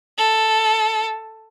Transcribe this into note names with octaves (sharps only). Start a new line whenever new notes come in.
A4